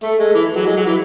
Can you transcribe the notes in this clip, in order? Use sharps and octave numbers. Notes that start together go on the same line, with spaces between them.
A3
G#3
E3
F#3
G#3
F#3
E3